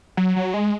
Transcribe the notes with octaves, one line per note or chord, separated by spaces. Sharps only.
F#3
F#3
G#3